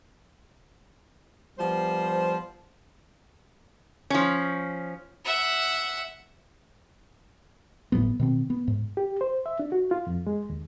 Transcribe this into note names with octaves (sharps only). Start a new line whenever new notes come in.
F3 G3 B3 C5
F3 C#4
E5 F#5
G1 A2 F#3 B3
B2 D#3 C4
B3
G#2
G4
C5
E5
D4
F#4
F4
F2
G#3
D#2